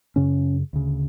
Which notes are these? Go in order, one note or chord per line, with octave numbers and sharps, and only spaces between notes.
F#2 C#3 C#4
D2 C#3